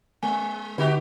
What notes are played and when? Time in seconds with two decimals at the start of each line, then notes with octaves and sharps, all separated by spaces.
0.23 G#3 G#5
0.78 D3 D#4 F#4 G4